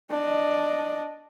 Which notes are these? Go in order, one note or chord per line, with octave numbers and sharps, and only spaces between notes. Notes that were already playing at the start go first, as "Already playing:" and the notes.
D4 D#5